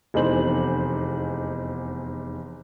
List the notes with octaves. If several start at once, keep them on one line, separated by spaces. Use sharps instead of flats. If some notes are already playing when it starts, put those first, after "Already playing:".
F1 E2 D#4 C5 F#7